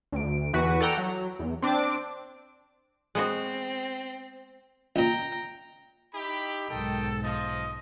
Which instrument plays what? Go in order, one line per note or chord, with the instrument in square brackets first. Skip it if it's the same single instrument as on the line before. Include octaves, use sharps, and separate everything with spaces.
[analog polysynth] D2 D7
E2 E3 F#4 B4 C#7
A4 D5 F#5 G5 A#5
F#3
E2
C4 D4 D6
[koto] G#3 B3 F#4 [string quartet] C4
[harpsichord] C#2 A#2 [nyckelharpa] G5 A#5
[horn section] D#4 E4 G4 [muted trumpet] B5
[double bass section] B1 G#2 [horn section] D#3 D#5 G5 [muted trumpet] A4
[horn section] F3 [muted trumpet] D#5